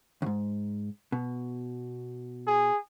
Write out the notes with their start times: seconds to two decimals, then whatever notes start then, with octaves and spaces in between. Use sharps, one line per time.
0.22 D#2 G#2
1.12 B2
2.47 G#4